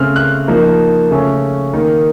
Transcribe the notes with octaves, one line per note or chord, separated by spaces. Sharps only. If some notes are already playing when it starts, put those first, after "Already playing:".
Already playing: C#3 A3 C4 F6
F#6
F3 A#3 D#4
C#3 A3 C#4
D#3 A#3 D#4